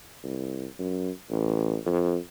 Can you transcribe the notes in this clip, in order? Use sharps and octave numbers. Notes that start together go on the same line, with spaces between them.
C2
F#2
A1
F2